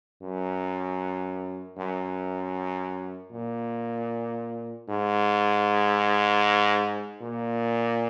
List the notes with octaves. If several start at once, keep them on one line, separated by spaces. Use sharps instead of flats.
F#2
F#2
A#2
G#2
A#2